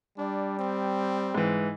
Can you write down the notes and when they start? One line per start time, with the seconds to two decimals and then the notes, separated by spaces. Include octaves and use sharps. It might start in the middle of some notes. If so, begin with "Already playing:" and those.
0.18 G3 D4
0.59 C4
1.34 G#2 E3